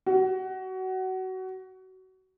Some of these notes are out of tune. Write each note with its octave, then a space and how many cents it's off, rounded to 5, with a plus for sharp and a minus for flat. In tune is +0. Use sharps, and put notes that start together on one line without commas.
F#4 +25